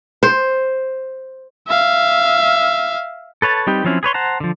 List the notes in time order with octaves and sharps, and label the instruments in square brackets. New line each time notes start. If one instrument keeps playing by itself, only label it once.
[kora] C5
[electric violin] E5 F5
[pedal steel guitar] A4 B4 C#5 A5
G3 C4 D#4 G4 B4
F3 F#3 C4 C#4 E4
G#4 B4 C#5 C6
C5 F#5 A5 A#5
D3 F3